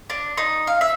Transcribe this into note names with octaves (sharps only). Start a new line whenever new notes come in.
D4
D#4
F5
E5